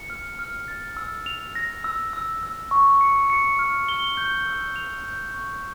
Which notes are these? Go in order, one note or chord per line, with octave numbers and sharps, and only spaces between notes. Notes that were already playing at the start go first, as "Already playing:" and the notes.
Already playing: C#7
F6
F6
A6
E6
F7
A#6
E6
E6
E6
C#6
C#7
C#7
F6
G7
G6
E6
F7
G6
C#6